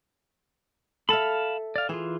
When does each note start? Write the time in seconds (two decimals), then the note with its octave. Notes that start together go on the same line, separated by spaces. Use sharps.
1.09 A4 E5 F5 A5 B5
1.76 D5 F5
1.89 E3 F4 G#4